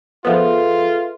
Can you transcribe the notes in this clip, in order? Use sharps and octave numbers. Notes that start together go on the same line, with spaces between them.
F3 B3 F4 G#4 A4 B4 E5